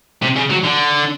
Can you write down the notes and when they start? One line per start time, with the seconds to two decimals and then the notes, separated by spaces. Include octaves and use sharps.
0.22 C3
0.37 C#3
0.51 F#3
0.65 D3